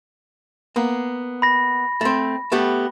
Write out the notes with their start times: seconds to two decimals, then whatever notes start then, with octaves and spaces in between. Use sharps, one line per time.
0.76 A#3 B3
1.42 B5 A#6
2.01 A3 C4
2.52 A3 B3 G4